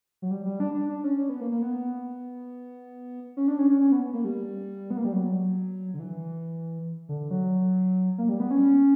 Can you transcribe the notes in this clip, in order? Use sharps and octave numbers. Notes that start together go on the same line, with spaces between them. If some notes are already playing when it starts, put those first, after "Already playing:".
F#3
G3
G3
D4
D4
D4
C#4
C#4
B3
A#3
A#3
B3
C#4
D4
C#4
C#4
C#4
B3
A#3
G3
B3
A#3
G3
F#3
D3
E3
D3
F#3
A#3
G3
B3
C#4